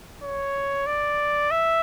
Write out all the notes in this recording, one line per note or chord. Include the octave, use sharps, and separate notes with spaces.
C#5
D5
E5